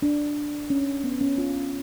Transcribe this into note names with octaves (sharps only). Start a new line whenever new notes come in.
D4
C#4
B3
C#4
F4